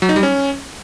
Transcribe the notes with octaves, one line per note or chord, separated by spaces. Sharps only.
F#3
D#4
G3
C#4